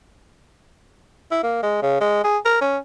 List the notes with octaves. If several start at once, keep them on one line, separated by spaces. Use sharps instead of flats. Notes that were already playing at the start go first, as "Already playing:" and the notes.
E4
A#3
G#3
C#3
G#3
G#4
A#4
C#4